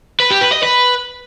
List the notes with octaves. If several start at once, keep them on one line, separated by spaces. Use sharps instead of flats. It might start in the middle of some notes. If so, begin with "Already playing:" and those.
B4
G4
B4
D#5
B4